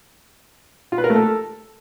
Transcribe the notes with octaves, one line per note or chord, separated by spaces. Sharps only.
F4
B4
A#4
A3
A4